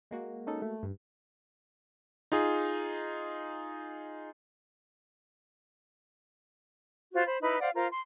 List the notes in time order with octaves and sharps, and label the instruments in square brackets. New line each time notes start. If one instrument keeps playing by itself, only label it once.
[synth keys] G#3 A#3 F#4
[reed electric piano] C#4 D#4 A4
A3
[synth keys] G2
[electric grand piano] D#4 F4 G#4
[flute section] F4 F#4 C5
C5 B5
D#4 E4 B4 B5
C5 D5 F5 F#5
F4 A#4 C5 F5
C6